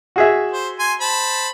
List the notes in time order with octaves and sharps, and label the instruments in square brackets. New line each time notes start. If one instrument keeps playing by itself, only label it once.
[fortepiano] F#4 G#4 E5
[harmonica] C5
G#5 C6
C5 A5 B5